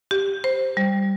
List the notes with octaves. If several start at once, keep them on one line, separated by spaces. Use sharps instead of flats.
G4
C5
G3